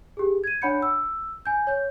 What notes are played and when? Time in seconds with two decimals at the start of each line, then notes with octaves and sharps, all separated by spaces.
0.17 G4 G#4
0.44 G#6 D#7
0.62 D4 C#5 F#5 B5 G6 C#7
0.82 E6
1.46 G#5 G6
1.67 C#5 G6